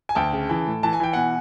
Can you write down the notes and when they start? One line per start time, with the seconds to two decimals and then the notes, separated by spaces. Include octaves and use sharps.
0.09 G#5
0.15 D2 G5 A5
0.33 C#3
0.49 E3
0.67 A2
0.83 E3 A5
0.93 G#5
1.00 E3 G5
1.13 B2 F#5 G#5